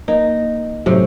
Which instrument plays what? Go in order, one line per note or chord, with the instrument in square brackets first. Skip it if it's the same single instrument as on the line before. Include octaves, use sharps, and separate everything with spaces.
[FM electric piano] A#3 [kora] D#4
[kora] A2 C3 [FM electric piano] F#3 C#4